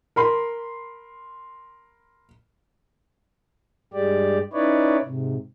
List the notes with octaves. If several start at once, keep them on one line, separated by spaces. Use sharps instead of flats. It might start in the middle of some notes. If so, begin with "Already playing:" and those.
A#4 B5 C6
G2 G#3 G4 D5
C#4 D#4 E4 B4 C#5 D5
G#2 C3